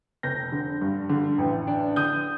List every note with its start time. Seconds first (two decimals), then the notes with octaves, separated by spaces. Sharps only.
0.23 F1 G6 A#6
0.52 D3
0.81 G2
1.09 D3
1.38 A1
1.67 D4
1.96 D3 D#6 G6